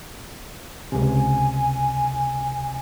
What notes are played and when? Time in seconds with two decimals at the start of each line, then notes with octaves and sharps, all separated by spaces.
0.92 C#2 C3 G#5